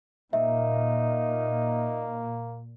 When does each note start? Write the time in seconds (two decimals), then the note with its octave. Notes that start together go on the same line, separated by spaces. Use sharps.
0.33 A#2 A#3 D#4 E5